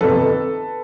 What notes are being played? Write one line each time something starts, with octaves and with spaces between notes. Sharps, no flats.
G1 F2 C3 D#3 A4 B4